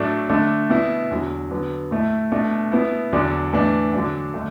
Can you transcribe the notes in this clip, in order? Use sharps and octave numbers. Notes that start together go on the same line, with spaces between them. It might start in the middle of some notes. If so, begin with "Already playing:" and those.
Already playing: A2 F#3 A3 D4
D3 A3 D4
B2 B3 E4
E2 D3 F#3
D3 F#3 B3
A2 A3 E4
B2 A3 D4
B2 B3 E4
E2 D3 F#3 D4
A2 E3 D4
D3 F#3 D4
D3 A3 D4